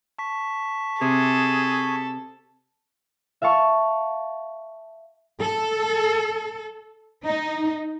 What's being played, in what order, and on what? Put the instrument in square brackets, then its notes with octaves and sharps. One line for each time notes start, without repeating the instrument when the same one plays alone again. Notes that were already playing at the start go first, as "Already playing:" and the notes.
[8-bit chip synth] A5 C#6 B6
[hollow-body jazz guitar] C3 [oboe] G#4 [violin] A4
[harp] E5 F5 A5 C#6
[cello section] A4
D#4